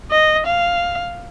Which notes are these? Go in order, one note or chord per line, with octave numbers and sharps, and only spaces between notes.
D#5
F5